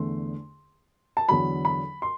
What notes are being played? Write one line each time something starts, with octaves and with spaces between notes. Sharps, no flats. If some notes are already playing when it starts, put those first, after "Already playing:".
Already playing: E2 D3 A3 C6
A5
E2 D3 F#3 B5
B5
C6